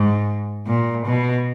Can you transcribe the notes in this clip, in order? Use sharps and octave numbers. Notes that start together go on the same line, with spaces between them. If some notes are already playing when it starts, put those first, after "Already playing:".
Already playing: G#2
A#2
B2